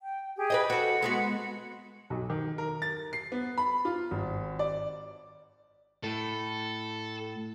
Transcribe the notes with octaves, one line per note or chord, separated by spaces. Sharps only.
G5
G4 G#4
B4 C#5 D#5
F#4 A4 F#5
G#3 B3 F#4
B1
D#3
A#4
A6
C7
B3
B5
F4
G#1
D5
A2 A4